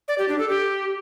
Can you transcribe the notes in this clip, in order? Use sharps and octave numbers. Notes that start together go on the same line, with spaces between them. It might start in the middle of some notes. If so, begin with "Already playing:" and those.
D5
G4
D4
A4
G4